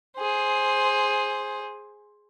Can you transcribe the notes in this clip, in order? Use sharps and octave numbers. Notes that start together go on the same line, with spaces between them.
G#4 C5